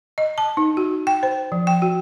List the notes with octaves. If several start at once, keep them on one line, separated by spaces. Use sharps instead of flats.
D#5
A5
D#4
F#4
G5
C5
F3
G5
F#4